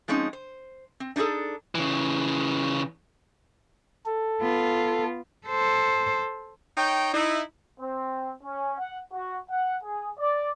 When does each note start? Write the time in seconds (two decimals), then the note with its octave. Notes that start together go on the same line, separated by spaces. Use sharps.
0.08 F3 G#3 C4 C#4 D#4
0.33 C5
1.00 C4
1.16 D4 D#4 F4 G#4 A4
1.75 C#3 E3
4.06 A4
4.41 B3 F4
5.48 A4 C5
6.76 D#4 C#5 G5
7.12 D#4 E4
7.80 C4
8.43 C#4
8.79 F#5
9.13 F#4
9.50 F#5
9.84 G#4
10.19 D5